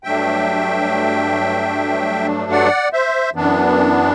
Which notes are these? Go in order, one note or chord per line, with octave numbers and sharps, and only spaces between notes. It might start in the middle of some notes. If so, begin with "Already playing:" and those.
G2 F#3 A3 D4 E5 G5
D5 F#5
C5 E5
F#2 E3 B3 D4